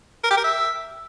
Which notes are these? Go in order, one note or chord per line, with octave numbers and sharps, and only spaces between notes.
A#4
G4
A#4
E5